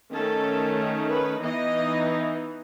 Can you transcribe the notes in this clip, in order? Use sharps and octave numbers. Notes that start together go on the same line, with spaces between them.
D#3 A3 C#4 A4
B4
E3 B3 D#4 D#5